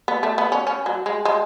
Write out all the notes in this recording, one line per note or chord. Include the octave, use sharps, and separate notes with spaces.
B3
A3
B3
C#4
C#4
F#3
G#3
G#3